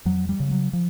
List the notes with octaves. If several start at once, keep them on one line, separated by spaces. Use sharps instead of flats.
F2 F#3
G3
C#3
F#3
F3